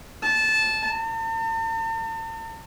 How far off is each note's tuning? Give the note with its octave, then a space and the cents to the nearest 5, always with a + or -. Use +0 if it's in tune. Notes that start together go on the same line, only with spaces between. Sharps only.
A5 -15
A5 +45